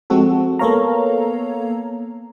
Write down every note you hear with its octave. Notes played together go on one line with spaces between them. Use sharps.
F3 G#3 C4 F#4 A4
A#3 B3 A4 C#5 F5 A#5